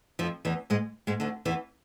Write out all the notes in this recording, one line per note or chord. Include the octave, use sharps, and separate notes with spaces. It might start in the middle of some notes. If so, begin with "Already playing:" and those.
F2 F3
E2 E3
G#2 G#3
G#2 G#3
D2 D3
E2 E3